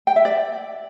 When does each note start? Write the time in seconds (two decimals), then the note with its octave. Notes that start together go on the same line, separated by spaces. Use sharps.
0.07 G5
0.16 E5
0.25 D5